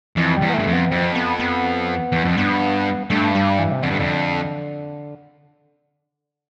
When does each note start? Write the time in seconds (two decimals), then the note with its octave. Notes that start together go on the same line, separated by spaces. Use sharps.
0.17 F2 E3
0.36 G3
0.42 E2
0.49 B3
0.54 A3
0.59 G2
0.67 F2
0.73 B3
0.90 F2 C4
1.15 B3
1.40 B3
2.12 E2
2.24 F2
2.37 G2 B3
3.10 G2 A3
3.35 G3
3.59 E3
3.72 C3
3.83 F2 D3
3.90 G2
3.99 F2